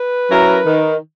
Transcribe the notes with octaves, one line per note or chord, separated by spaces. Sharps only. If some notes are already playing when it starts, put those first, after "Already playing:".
Already playing: B4
F#3 C#4 E4 A#4
D#3